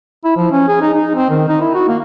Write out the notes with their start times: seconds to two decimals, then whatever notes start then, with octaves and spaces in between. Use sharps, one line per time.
0.25 E4
0.37 F3
0.52 C#4
0.68 G#4
0.81 D#4
0.93 D#4
1.15 C4
1.30 D#3
1.49 D#4
1.61 E4
1.74 F#4
1.88 A#3